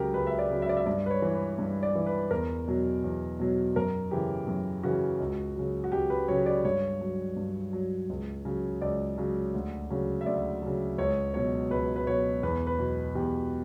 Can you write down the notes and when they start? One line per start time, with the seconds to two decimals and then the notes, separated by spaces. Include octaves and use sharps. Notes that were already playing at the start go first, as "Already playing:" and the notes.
Already playing: C#2 C#3 F#3 G4 A#4
0.14 C#2 B4
0.27 E5
0.39 D5
0.50 C#3 F#3
0.62 E5
0.69 D5
0.77 E5
0.86 G2 D5
1.06 B4
1.11 C#5
1.22 E3
1.35 B4
1.59 G2
1.83 D5
1.95 E3
2.06 B4
2.31 E2 A#4
2.68 B2 F#3
3.04 E2
3.40 B2 F#3
3.76 F#2 A#4
4.11 C#3 E3 G4
4.48 F#2
4.83 C#3 E3 F#4
5.20 C#2
5.56 C#3 F#3
5.84 F#4
5.92 C#2 G4
6.10 B4
6.28 C#3 F#3 C#5
6.46 D5
6.64 G2 C#5
7.01 F#3
7.37 G2
7.73 F#3
8.10 C#2
8.45 C#3 F#3
8.81 C#2 D5
9.18 C#3 F#3
9.54 D2
9.90 C#3 F#3
10.21 E5
10.26 D2 D5
10.62 C#3 F#3
10.98 C#2 C#5
11.34 B2 F#3 C#5
11.70 C#2 B4
11.96 B4
12.07 B2 F#3 C#5
12.43 E2 B4
12.67 B4
12.79 B2 F#3
13.15 E2 G4